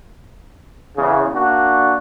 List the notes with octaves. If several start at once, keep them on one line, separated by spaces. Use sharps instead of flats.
E2 C#3
A#3 D4 F#4